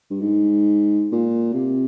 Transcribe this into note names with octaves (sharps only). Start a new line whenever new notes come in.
G2
G#2
A#2
C3